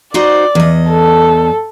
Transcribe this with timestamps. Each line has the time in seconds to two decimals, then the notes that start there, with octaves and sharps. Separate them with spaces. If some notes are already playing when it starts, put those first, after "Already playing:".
0.14 D#4 F#4 C5 D5
0.55 E2 D#5
0.89 A4